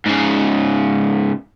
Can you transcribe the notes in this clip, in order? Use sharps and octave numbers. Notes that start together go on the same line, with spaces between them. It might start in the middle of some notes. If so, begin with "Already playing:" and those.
G#2 C#3